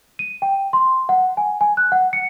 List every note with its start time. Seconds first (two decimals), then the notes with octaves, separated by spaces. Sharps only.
0.19 D#7
0.42 G5
0.73 C6
1.09 F#5
1.37 G#5
1.61 G#5
1.77 F#6
1.92 F#5
2.13 C#7